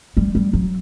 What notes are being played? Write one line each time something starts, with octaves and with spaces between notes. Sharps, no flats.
G3
G3
F#3